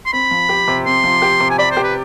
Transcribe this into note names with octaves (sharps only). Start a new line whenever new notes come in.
C6
C4 B5
F3
G4
C3
C4 C6
F3
G4
C3
G#5
D5 B5
C5
G4
B4